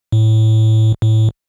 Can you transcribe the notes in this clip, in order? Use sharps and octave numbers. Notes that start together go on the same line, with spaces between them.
A2
A2